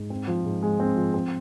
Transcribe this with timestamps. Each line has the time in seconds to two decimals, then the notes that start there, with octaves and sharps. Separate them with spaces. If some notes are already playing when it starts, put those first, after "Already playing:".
Already playing: G#2
0.10 C4
0.28 F3
0.45 G#2
0.62 G#3
0.80 C4
0.96 F3
1.14 C4